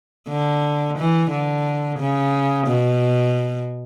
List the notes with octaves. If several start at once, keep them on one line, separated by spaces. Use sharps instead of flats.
D3
E3
D3
C#3
B2